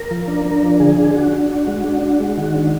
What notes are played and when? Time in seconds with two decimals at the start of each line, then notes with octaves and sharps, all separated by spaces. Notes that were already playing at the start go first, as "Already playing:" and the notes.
Already playing: A#4
0.11 F3
0.28 D4
0.45 D4
0.63 F3
0.80 D3 G#4
0.98 D4
1.14 D4 F#4
1.32 D4
1.50 D4
1.67 G#3
1.84 D4
2.02 D4
2.20 G#3
2.38 D#3
2.54 D4